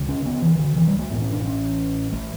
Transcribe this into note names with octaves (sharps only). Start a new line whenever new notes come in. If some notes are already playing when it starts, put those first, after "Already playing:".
Already playing: D2 C#3
C#4
B3
E3
D3
E3
G3
A3
A1 A2 B3
C#4
D4
C#4
A3